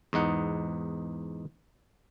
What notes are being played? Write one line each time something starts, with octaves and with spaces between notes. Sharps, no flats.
E2 G#2 D#4 F#5